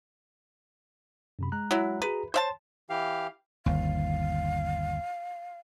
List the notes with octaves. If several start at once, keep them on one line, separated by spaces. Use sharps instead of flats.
F#2 C3 B5
G#3 A#5 F#6
F#3 E4
F#4 G#4 B4 A#5
C5 C#5 E5 A5
E3 G4 F5
G1 D#2 F5